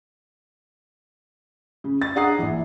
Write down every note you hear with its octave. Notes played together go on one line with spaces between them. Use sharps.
C#3
A6
D4 G#4 F#5 A#5 D#6 C7
A#1 E3